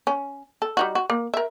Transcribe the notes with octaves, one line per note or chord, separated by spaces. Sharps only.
C#4
A4
G3 D#4 F#4
F#4
A#3
A#4 E5